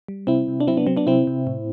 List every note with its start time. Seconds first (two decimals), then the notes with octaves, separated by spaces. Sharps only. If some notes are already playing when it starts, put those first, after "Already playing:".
0.08 G3
0.27 C3 C4 E4
0.48 C3
0.60 D4
0.67 F#3 C4 E4
0.77 B3 D4
0.87 F#3 C4
0.97 B3 D4
1.07 C3 C4 E4
1.27 C3
1.47 A2